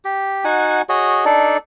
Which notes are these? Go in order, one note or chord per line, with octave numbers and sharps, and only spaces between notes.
G4
D#4 F#4 F#5 G#5
F#4 G#4 C#5 D#5
D4 D#4 A4 D5